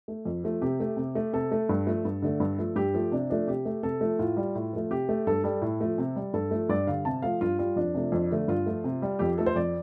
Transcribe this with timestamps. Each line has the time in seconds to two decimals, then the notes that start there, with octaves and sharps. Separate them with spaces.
0.08 A3
0.25 F2
0.44 F3 A3
0.62 C3 G4
0.80 A3
0.97 C3
1.15 A3
1.33 C3 A4
1.51 A3
1.69 G2
1.87 F3 A3
2.05 G2
2.22 D3 A3
2.40 G2
2.58 F3 A3
2.76 G2 G4
2.94 F3 A3
3.12 C3 D4
3.30 F3 A3 D4
3.47 C3 G4
3.65 A3
3.83 C3 A4
4.01 F3 A3
4.19 A2 F4
4.37 G3
4.55 A2
4.73 F3 A3
4.90 C3 G4
5.09 A3
5.27 G2 A4
5.44 G3 A4
5.62 A2
5.81 F3 A3
5.98 C3
6.16 G3
6.34 G2 A4
6.51 F3 A3
6.69 G2 D5
6.87 D3 G3 F5
7.05 C3 A5
7.22 F3 A3 F5
7.41 G2 F4
7.59 G3 F4
7.76 F2 D4
7.94 C3 F3 A3
8.12 F2
8.31 D3 A3
8.48 G2 F4
8.66 F3 A3
8.84 C3
9.02 G3
9.19 F2 G4
9.37 F3 A3 A4
9.46 C5
9.56 F2 D5